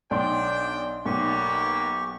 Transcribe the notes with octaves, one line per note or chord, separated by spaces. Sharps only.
B1 D4 D5 G5 C6
B1 A#3 B3 G4 C#6